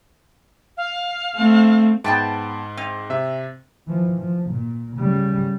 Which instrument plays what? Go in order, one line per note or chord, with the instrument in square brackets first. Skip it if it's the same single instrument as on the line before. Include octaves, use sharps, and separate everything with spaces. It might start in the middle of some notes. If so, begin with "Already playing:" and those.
[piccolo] F5
[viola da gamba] A3 C4
[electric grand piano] G#2 [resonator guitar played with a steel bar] B3 G5 A5
[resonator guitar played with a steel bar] C4
[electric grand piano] C3 E5
[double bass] E3 F3
F3
A#2
C#3 G3